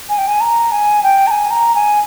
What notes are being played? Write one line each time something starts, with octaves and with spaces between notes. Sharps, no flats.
G#5
G5
G#5
A#5
G#5
G5
A#5
G#5
A#5
G#5